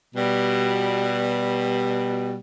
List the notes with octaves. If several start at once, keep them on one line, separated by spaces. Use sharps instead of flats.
B2 G3